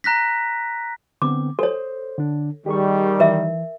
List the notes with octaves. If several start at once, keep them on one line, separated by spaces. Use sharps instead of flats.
A#5 F#6 A#6 B6
D3 B3 C4 D6
A4 C5 C#5
D3 D4
D#3 G3 G4 G#4 C#6
E3 A#4 E5